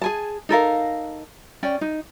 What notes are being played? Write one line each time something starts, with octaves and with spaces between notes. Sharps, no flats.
G#4 G#5 A5
D#4 A4 A#4 F5
C#4 D5 G5
D#4